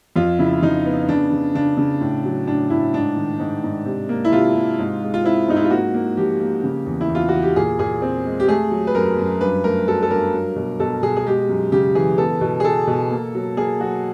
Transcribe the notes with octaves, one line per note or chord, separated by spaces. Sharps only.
F2 F4
C#3 E4
F2 D#4
B3
C#3 D4
C#3
C#3 D4
C#3
A2
F#3
A2 D4
A2 E4
G#2 D4
D#3
G#2
G#2
C3
A#3
E4
C3 F4
C3
G#2
G#3
F4
C4 E4
G#2 D#4
E4
F4
A#3 F#4
A#3
F3 G4
A#3
C#3
E2
E4
E2
F4
E2 F#4
G4
A#2 G#4
A#2 G#4
C4
G#3
G4
A3 G#4
F#3
B4
F#2 A#4
F#2
G2 B4
A3 A#4
F#3 A4
A4
G2 A#4
F#3
B2
B2 A4
B2 G#4
G#4
G#3 G4
F#2
C#3 G4
E3 G#4
B3 A4
B2
G#4
B3 A4
B2
A#3
F#3
A#3 G#4
F#3 F#4